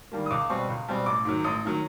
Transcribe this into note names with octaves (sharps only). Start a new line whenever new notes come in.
D#3 G3 A#3
D#6
C#2 D6
B2 G3 C4 C#6
C#2
B2 G3 C4
A1 D6
G#2 D#3 F#3
A1 D#6
D#3 F#3